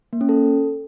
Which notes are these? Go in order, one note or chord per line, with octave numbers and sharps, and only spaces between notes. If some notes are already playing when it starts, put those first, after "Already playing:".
A#3
C#4
A4